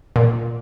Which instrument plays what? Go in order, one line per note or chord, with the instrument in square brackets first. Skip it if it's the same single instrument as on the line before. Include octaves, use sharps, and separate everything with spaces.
[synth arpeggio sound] A#2